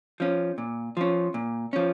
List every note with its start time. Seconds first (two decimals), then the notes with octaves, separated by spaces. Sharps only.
0.20 F3 C#4
0.58 A#2
0.97 F3 C#4
1.34 A#2
1.73 F3 C#4